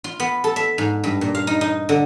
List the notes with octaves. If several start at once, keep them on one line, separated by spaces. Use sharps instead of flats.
F4
B3
A4
E5
G#2
G2
A#2
F5
D#4
D#4
D3